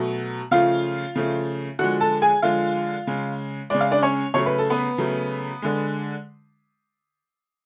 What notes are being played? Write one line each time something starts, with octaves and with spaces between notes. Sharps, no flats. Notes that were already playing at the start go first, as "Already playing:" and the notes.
Already playing: B2 F#3 A3
C#3 F3 A3 F4 F5
C#3 F3 A3
D3 F3 G#3 F#4 F#5
A4 A5
G#4 G#5
D3 F3 G#3 F4 F5
C#3 G#3
C#3 G#3 D5
F5
D4 D5
C#4 C#5
C#3 F#3 A3 C#5
B4
A4
B3 B4
C#3 F#3 A3
D3 G#3